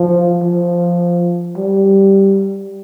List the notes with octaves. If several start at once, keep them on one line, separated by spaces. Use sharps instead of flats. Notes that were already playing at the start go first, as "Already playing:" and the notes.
Already playing: F3
F3
G3